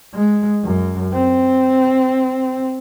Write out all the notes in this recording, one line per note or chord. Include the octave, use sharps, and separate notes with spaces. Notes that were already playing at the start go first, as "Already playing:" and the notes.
G#3
F#2
C4